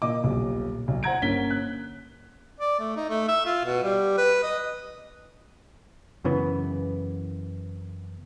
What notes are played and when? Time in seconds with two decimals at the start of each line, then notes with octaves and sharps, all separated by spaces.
0.02 A#2 D#5 D6
0.23 D#1 B1
0.88 B1
1.03 C5 F#5 A#5 G#6 D7
1.22 G1 A#3 C#4 B6 G7
1.50 F#6
2.60 D5
2.80 A3
2.96 D#4
3.10 A3
3.28 E5
3.46 F4
3.65 B2
3.84 G3
4.17 B4
4.43 D#5
6.24 F#2 C#3 E3 B3